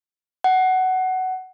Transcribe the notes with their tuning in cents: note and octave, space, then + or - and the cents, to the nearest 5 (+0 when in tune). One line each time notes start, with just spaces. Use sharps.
F#5 +15